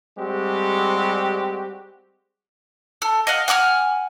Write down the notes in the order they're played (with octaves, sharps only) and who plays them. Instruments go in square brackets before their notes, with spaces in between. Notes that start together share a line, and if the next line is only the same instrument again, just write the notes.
[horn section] G3 G#3 C4 F#4 G4
[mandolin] A4
D#5 F5 F#5
F#5 G#5 D#6 F6